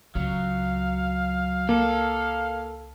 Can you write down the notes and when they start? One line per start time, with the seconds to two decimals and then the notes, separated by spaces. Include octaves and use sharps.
0.15 C#2 F#3 F5
1.69 A#3 A4